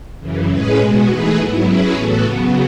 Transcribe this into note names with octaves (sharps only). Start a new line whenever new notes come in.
F#2 C#3 E3
A2 G#3 C#4 G#4 B4
B2 G#3 B3 F#4
E3 A3 D#4 G#4 B4
G#2 F#3 B3 E4
F#3 C#4 E4 G#4 B4
A2 E3 B3 F#4 A4
C#3 F#3 B3